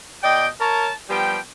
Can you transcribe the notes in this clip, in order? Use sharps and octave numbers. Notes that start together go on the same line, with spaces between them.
B2 D5 D#5 G5
A#4 C#5 A5
F3 G3 B3 G4 G5